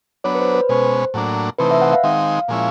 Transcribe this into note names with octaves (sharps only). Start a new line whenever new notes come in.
F#3 B3 D4 C#5
B4
C5
B4
B2 G#3 C#4 C5
A2 F#3 A#3 D4
C3 E3 A3 C4 D#4 B4
E5
F#5
F5
D#3 G#3 C4 D#4
A#2 F3 G#3 C#4 E4